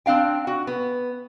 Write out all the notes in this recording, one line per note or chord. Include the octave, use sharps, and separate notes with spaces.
C4 D4 F5 G5
F#4
B3